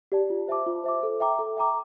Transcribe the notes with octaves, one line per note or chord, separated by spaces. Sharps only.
G4 D5 A5
F4
C5 E5 A5 D6
F4
C5 E5 A5 D6
A4
E5 G5 A#5 D6
A4
E5 G5 A#5 D6